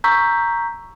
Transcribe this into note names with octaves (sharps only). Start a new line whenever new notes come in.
A#5 C#6 E6 G6 B6